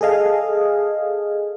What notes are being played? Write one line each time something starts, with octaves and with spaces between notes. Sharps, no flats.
G#4 A4 D#5 F5 G#5